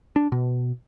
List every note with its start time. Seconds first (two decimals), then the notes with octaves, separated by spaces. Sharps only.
0.16 D4
0.32 B2